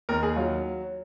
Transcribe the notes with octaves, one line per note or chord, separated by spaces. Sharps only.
D#2 A#4
G#4
F#3 F4